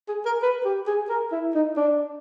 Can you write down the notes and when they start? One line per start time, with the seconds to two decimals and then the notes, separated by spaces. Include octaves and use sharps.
0.09 G#4
0.25 A#4
0.42 B4
0.65 G4
0.87 G#4
1.09 A#4
1.32 E4
1.55 D#4
1.77 D4